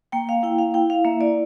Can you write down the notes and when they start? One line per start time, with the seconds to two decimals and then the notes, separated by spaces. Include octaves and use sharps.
0.12 A#3 G5
0.29 F5
0.43 E4 G5
0.58 F5
0.74 E4 G5
0.90 F5
1.05 A#3 E5
1.21 D5